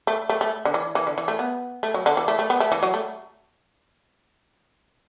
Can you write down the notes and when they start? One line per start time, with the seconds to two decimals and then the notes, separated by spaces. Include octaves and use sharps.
0.07 A3
0.29 A3
0.41 A3
0.65 D3
0.74 E3
0.95 E3
1.07 D3
1.18 E3
1.28 A3
1.39 B3
1.83 A3
1.94 F#3
2.06 D3
2.17 E3
2.28 A3
2.39 A3
2.50 B3
2.60 A3
2.72 E3
2.83 F#3
2.94 A3